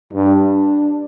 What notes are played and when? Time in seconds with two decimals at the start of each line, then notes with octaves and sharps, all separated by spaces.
0.12 G2 D4